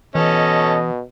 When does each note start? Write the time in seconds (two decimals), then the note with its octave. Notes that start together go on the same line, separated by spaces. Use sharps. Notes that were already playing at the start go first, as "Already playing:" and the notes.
0.15 B2 E3 C#4 A4 D#5